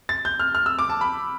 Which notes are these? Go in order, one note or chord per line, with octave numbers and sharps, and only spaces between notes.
A6
G6
F6
F6
E6
D6
A5
B5